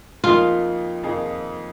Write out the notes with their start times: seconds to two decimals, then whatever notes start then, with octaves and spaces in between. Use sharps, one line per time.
0.24 F2 F3 A#3 D#4 F4 G#4
1.03 F2 F3 A#3 D#4 G#4